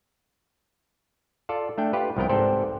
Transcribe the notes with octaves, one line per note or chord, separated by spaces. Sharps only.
F4 A4 D5
A3 D4 G5
F4 G4 B4
C2 F3 B3 A#4 G5
G#2 C4 G4 A4 C5 D5